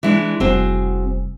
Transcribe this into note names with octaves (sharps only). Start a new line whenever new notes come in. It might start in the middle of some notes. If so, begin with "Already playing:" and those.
E3 G#3 D4
F1 G3 C4 F#4 G#4